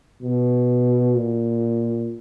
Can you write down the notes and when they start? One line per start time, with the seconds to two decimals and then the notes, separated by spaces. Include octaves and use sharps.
0.22 B2
1.16 A#2